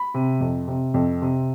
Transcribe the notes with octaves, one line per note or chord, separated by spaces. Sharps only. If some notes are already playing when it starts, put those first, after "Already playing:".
Already playing: B5
C3
F2
C3
F2
C3